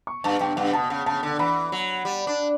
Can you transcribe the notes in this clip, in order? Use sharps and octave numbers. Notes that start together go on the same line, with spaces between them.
C#6
G2 A5
G2 G5
G2 F#5
B2 A5
C#3
C#3 A5
D3
E3 B5
F#3
G3
D4